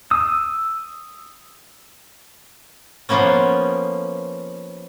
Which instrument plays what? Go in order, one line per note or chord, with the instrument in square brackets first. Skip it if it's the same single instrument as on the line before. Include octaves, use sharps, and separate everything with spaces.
[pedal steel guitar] D#6 E6
[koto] F3 A#3 B3 C#4